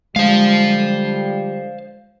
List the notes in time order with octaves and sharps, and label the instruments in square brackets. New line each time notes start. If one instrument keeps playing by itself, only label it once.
[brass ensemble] D3 F3 G3 [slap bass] G#3 [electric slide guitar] C5 F5